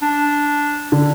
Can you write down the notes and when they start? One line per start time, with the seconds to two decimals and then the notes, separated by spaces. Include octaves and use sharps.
0.02 D4
0.92 D3